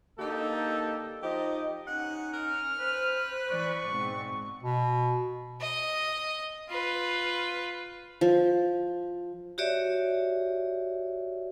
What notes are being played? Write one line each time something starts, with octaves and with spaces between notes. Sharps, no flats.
D3 A#3 D#4 G4 A4
F3 D#4 G4 D#5
C#4 D#4 F#5
A#4 F6
B4 C5
E3 D5 C#6
G#2 B2 C4
B2
D#5
F4 B4
F3
F#4 G4 C#5 D5 E5